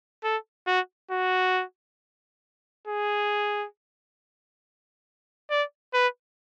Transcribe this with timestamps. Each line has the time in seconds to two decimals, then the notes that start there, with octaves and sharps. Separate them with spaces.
0.24 A4
0.67 F#4
1.11 F#4
2.88 G#4
5.50 D5
5.94 B4